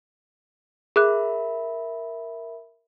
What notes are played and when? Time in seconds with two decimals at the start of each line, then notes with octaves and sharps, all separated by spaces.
0.96 G#4 A#4 E5 B5 D6 F#6